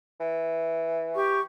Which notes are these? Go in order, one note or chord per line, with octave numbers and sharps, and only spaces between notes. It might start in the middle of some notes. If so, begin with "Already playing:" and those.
E3
G4 C#6